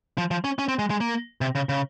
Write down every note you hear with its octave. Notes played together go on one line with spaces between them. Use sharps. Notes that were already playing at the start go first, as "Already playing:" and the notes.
F3
F3
C#4
C#4
C4
G#3
G#3
A#3
C3
C#3
C#3